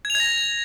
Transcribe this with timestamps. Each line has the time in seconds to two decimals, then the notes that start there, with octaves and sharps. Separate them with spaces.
0.05 G#6
0.10 F7
0.15 G#6
0.20 A#6